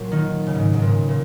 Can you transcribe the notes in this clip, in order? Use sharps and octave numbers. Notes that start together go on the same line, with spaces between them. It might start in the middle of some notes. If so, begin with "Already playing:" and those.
Already playing: A#2 F#3
D#3
C#3
G#2
G#2
A#2
A#2